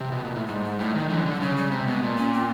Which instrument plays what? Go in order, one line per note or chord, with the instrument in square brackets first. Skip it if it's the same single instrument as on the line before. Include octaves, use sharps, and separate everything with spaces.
[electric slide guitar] C3
B2
A#2
A2
[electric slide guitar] G#2 [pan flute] G3
[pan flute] G#3
[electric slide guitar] A2 [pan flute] G3
[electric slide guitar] D#3 [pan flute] G3
[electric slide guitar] D3 E3 [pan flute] F#3
[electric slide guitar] D3
[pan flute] G3
[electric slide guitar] C#3 [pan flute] F#3
[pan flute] G3
[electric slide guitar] C3 [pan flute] G#3
[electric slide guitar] B2 [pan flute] G#3
[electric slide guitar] A#2
[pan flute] C#4
C4